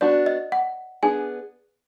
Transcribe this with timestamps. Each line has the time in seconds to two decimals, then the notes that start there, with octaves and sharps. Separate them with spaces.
0.01 B3 D4 F#4 D5
0.26 D#5
0.52 F#5
1.03 B3 D4 G#4 G#5